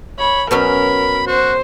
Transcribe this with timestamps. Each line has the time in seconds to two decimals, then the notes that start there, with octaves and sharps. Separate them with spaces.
0.19 C#5 B5
0.51 B2 F#3 C#4 A#4 B5
1.27 F#4 C5